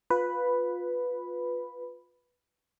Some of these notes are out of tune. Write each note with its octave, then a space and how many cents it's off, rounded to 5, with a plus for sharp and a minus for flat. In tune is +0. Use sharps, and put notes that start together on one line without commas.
F4 +20 B4 +0 B5 +0